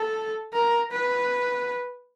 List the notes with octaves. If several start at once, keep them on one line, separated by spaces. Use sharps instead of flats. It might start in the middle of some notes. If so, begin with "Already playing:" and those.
Already playing: A4
A#4
B4